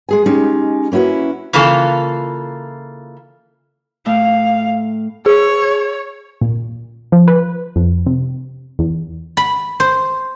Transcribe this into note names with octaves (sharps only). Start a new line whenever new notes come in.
G#3 G#4 G#5
G#3 C#4 D#4 G4
A#3 C#4 E4 F#4 B4
C#3 E3 A#3 F4 A4
A2 A3 F5
G#4 C#5
A#2
F3
B4
F2
C3
E2
B5
C5